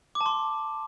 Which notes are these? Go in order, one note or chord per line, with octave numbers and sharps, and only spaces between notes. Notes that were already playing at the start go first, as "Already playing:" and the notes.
D6
A5
C6